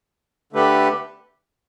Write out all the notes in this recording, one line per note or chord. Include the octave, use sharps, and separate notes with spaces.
D3 A3 G4 B4